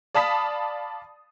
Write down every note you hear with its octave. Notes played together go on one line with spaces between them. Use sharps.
D5 F5 A5 B5 D#6 B6